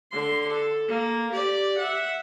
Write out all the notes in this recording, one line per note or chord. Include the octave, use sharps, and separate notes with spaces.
D3 C6
A4
A#3
G4 D5
E5 F#5